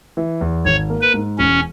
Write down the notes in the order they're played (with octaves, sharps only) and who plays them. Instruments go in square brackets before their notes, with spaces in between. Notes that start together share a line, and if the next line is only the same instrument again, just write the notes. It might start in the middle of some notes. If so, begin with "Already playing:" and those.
[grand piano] E3
E2
[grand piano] G#1 [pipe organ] C#5
[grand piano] A#3
[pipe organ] B4
[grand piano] G#2
[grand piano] E1 [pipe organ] C#4